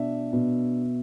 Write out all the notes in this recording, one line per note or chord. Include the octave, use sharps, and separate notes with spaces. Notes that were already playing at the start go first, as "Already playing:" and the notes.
Already playing: B2 D4 E5
B2